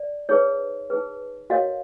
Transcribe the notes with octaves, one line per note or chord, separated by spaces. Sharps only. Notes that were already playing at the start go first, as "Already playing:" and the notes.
Already playing: D5
D#4 G#4 B4 C#5
D#4 G#4 B4
F#4 A#4 C#5 D#5 F5